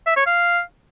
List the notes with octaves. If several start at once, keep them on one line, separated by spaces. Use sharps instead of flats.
E5
C#5
F5